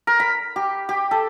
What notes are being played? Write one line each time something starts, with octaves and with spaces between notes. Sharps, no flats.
A#4
B5
G4
G4
A4